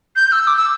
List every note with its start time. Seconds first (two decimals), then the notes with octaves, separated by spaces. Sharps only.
0.16 G6
0.32 E6
0.47 D6
0.56 E6